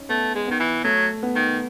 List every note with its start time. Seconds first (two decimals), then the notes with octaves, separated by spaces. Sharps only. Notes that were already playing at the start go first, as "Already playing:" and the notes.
Already playing: C#4 D#4
0.09 A3 B3
0.34 G#3
0.48 D#3 B3
0.60 E3
0.84 F#3 A3
1.23 B3
1.35 D#3